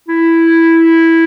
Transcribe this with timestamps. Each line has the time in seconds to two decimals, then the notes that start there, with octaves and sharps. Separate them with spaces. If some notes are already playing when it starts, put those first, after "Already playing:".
0.09 E4